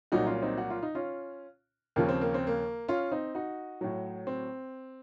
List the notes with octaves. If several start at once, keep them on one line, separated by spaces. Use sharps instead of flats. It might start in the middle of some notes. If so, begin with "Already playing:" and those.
C2 A#2 F#3 D#4 F#4
C#4 F4
C4 D#4
F#4
F4
D#4
C#4 F4
D#2 C#3 F3 A#3
C4
A#3
C4
A#3
C#4 F4
C4 D#4
D#4 F#4
A2 F#3
C4